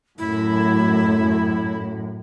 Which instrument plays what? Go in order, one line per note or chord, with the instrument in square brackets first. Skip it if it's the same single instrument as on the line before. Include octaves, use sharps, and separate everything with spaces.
[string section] F#2 A2 [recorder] E4